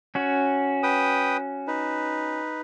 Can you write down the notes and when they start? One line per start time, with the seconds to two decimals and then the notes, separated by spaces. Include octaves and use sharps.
0.15 C#4 F#4
0.83 B4 G5 D#6
1.67 D#4 B4